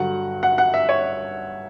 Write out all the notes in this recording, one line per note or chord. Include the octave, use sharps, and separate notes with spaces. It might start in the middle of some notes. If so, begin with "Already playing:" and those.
Already playing: G2 D3 F#3 F#5
F#5
F#5
E5
C#5